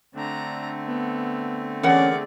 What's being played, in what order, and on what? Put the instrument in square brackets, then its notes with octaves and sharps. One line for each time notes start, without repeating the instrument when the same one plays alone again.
[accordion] D3 A3 C4 [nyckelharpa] D4 A#5
[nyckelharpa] B3
[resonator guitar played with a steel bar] E3 A#4 F#5 [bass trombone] C#4 [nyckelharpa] G#4 D5